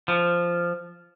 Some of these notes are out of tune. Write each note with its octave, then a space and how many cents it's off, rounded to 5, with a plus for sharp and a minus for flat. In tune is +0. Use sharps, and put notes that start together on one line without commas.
F3 -10